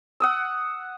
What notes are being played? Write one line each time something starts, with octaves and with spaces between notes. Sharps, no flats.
F#5 D#6 E6